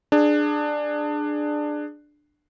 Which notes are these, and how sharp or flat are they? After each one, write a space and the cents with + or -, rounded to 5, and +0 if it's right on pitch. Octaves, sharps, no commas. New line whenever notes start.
D4 +15 G#4 +0